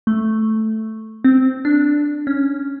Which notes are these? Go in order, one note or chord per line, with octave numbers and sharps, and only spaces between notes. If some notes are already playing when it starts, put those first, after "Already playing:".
A3
C4
D4
C#4